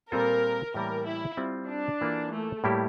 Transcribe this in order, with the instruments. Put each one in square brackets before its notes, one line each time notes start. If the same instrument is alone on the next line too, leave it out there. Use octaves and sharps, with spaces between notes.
[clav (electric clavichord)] A#2 G3 C4 F4 A4 [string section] A#4
[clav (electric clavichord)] A2 E3 G3 A#3 [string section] A#4
[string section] E4
[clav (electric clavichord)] G3 C4 F4
[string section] D4
[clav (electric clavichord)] E3 A#3 F4 A4
[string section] A3
[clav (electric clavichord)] A2 G3 A#3 E4 G4